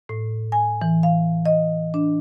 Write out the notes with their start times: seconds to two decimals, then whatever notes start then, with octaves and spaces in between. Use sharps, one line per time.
0.09 A2
0.52 G#5
0.81 E3
1.03 F5
1.46 D#5
1.94 D4